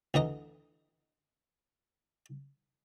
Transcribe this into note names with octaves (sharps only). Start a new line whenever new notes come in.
D2 E3 D#5 A#5